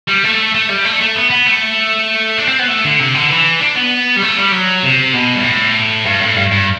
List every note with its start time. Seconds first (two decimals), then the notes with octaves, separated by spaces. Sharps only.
0.08 G3
0.24 A3
0.54 A3
0.69 G3
0.84 A3
1.01 A3
1.15 B3
1.30 B3
1.46 A3
2.38 D4
2.48 C4
2.59 B3
2.68 A3
2.84 D3
3.00 C3
3.15 D3
3.30 E3
3.60 D4
3.76 B3
4.17 G3
4.22 A3
4.37 G3
4.52 F#3
4.83 C3
5.14 B2
5.35 G2
5.44 A2
6.05 G2
6.20 A2
6.36 G2
6.51 G2